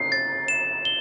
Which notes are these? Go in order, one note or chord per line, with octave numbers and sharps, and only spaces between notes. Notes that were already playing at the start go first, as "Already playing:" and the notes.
Already playing: C7
A6
E7
G7